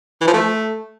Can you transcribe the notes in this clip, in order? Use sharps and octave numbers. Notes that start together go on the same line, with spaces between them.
E3
F3
A3